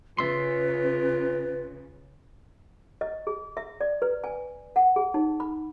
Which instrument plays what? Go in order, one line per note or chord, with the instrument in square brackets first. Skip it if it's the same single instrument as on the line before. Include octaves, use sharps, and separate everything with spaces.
[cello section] C#3 [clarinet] F4 [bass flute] B4 [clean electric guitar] E5 C6
[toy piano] D#5
G#4
E5
D5
B4
G#5
F#5
G#4
D#4
B5